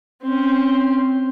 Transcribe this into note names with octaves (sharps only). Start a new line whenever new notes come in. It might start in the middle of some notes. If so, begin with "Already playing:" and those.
C4 C#4